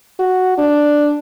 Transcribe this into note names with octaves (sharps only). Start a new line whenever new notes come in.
F#4
D4